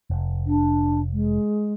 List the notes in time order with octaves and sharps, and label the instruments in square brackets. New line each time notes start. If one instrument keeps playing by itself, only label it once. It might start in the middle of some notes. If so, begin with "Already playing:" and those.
[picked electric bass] F1
[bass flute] D4
G#3